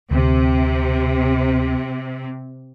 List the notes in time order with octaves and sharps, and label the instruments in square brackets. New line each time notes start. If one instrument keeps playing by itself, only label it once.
[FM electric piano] D2 [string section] C3